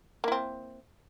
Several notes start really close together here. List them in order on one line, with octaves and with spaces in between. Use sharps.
A#3 E4 C4